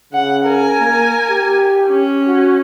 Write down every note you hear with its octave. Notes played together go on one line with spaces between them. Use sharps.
C#3 F#5
A#4 G#5
A#3
G4
C#4
F#4